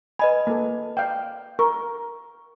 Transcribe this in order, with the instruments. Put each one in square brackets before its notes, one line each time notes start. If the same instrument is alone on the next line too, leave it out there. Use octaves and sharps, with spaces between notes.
[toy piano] B4 D#5 B5 [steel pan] G#5
[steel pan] A#3 A4
D5 F5 G5
[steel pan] A#4 [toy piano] C#6